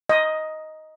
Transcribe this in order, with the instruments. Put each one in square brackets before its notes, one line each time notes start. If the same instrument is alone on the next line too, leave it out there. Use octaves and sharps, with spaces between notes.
[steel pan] D#5